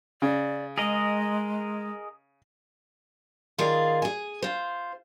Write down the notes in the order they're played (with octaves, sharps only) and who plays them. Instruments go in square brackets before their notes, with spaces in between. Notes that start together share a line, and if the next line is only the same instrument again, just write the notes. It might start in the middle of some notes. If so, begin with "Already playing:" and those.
[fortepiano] C#3 [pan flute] D5
[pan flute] G#3 [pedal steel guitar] G#4 A#4 D#5
[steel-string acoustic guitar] D#3 F4 G#4 D5 F5
G#4 G#5
F4 C5